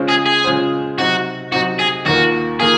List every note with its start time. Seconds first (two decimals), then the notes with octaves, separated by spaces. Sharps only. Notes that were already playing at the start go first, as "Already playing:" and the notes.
Already playing: C#3 G#3 C#4 F4 C5
0.09 G#4
0.26 G#4
0.44 C#3 G#3 C#4 F4 C5
0.98 C3 F#3 C4 D#4 F#4
1.52 C3 F#3 C4 D#4 F#4
1.79 G#4
2.06 D#2 D#3 A#3 F4 F#4
2.60 D#3 A#3 F4 G#4